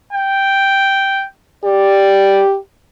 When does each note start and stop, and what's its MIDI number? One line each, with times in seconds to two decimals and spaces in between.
0.13 1.25 79
1.65 2.57 67
1.65 2.43 74